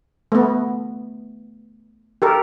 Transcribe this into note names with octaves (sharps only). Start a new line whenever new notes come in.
A3 B3
G4 A4 A#4